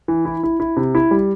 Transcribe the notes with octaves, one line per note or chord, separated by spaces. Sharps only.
E3
E4
E4
E4
C3
E4
G3